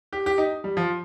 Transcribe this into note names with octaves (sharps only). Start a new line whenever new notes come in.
G4
G4
D#4
G3
F3